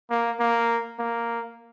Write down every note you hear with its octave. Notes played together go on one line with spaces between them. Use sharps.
A#3
A#3
A#3